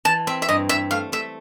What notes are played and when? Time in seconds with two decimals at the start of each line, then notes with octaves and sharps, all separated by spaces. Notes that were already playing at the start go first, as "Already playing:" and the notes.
0.05 E3 A5
0.27 C4 E5
0.42 E5
0.49 G2 D#5
0.69 G2 E5
0.91 A3 F5
1.12 A3 E5